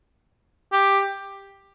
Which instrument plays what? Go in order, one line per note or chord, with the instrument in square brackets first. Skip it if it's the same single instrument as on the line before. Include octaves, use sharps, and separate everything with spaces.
[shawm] G4